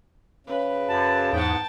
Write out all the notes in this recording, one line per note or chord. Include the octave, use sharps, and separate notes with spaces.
C#3 B4
F#2 F#4 A5
E2 G#2 B3 G5 A5